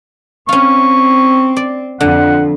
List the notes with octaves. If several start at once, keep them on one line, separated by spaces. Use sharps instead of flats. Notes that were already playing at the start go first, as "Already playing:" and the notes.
C4 C#4 F4 C#6
D5
F2 D3 F#5